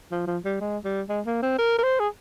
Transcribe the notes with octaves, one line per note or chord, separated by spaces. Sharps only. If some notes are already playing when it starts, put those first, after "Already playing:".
F3
F3
G3
G#3
G3
G#3
A#3
C4
A#4
A#4
C5
G#4